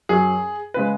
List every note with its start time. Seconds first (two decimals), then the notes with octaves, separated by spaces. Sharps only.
0.09 F#2 F#3 G#4
0.74 C#3 G#3 B4